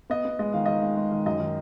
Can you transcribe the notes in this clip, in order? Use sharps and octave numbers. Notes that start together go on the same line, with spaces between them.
B3 D#5
B3
G#3 D#5
D#3 F5
D#3 D#5
G#3
G#3
D#3
F#2 D#5
D#3